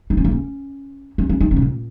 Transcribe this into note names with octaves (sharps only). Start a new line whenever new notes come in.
D#4
C#4
A#3
C#4
C#4
C#4
D#4
C#4
G#2
A#2